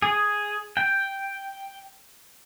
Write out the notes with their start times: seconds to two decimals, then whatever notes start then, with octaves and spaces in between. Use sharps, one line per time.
0.02 G#4
0.77 G5